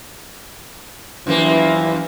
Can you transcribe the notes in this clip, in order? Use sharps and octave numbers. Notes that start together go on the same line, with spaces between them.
F#2 E3 F3 A#3